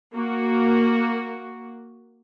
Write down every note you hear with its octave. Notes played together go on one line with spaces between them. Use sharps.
A#3 F#4